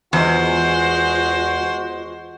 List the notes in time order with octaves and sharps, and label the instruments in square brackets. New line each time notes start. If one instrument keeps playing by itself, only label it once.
[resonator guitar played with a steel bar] E2 [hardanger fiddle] G#3 C5 [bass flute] F4 [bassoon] F#4